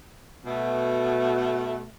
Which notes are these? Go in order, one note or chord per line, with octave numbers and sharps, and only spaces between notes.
B2 A3